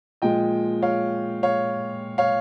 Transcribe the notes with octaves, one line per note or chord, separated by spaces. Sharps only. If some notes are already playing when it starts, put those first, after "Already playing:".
A#2 F3 G#3 D#5 G5
C#5 F5
C#5 F5
C#5 F5